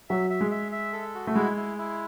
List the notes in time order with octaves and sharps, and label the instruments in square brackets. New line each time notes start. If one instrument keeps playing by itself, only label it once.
[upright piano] F#3 [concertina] E5
[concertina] E5
[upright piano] G#3
[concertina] E5
E5
A4
F#4
[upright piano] A3
[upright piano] G#3 [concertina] E4
[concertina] E4
E4